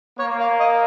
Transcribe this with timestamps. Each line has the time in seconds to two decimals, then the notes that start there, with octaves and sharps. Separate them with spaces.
0.20 A#3 C#5
0.40 F5
0.60 D#5